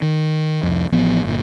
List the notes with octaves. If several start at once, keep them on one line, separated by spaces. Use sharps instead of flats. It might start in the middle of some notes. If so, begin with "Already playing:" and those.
D#3
C2 F2
A1 F3 B3
G1 A#2